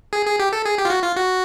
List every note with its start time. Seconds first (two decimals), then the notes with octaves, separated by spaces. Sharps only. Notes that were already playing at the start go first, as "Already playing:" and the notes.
0.13 G#4
0.27 G#4
0.39 G4
0.53 A4
0.65 G#4
0.78 G4
0.85 F4
0.90 F#4
1.03 F4
1.16 F#4